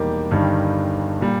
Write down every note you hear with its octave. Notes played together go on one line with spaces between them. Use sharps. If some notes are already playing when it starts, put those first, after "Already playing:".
Already playing: E1 E2 D#3 G3 A#3 D#4 G4
G1 G2 D#3 G3
A#2 G3